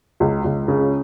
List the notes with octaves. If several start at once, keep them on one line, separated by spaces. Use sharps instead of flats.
C#2
C#2
C#3